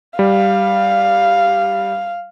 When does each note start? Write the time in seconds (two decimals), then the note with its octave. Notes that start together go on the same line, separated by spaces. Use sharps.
0.19 G3 F5